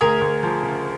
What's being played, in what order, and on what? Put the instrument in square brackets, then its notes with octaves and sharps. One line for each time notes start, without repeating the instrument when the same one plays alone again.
[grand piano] D2 [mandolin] G#4 A#4
[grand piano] D2
F3
C#3